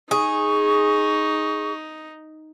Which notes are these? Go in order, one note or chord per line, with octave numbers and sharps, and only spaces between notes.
D#4 G#4 C#6